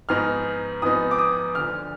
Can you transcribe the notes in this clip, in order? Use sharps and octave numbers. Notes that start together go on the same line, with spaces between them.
G#2 F3 B3 D#4 F6
G#2 F3 B3 D#4 D#6
D6
D#6
D2 D3 F3 F6